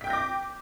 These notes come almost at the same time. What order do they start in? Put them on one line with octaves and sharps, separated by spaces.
B6 G5 G6 A#6 D6